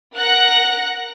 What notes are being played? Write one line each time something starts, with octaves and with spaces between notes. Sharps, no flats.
A#4 F#5 F#6 A#6